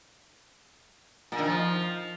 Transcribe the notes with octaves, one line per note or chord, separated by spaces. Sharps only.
A#2
D#3
F3